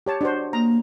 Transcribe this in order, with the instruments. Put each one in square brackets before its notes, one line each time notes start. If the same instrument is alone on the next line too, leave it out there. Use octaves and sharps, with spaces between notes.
[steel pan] G4 C#5 A5
D4 F#4 C5
[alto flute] A#3 [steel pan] A#5